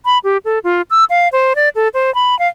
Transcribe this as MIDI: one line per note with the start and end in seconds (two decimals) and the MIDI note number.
0.05 0.18 83
0.24 0.37 67
0.45 0.59 69
0.64 0.82 65
0.90 1.04 88
1.10 1.28 77
1.32 1.53 72
1.56 1.69 74
1.75 1.88 69
1.94 2.13 72
2.15 2.38 83
2.39 2.48 77